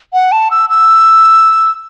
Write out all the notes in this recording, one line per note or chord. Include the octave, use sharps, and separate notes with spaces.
F#5
A5
E6
E6